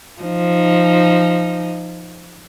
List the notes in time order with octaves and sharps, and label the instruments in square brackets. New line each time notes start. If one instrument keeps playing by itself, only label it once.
[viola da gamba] F3 D#4